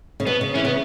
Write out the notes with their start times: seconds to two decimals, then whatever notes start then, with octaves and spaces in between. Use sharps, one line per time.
0.20 C#3
0.26 B2 B3
0.41 C#3
0.54 E3 C#4
0.65 C#3 B3